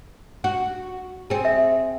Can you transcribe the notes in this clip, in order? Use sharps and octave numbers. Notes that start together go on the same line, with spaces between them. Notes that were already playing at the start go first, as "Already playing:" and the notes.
F#4
C4 G#4
E5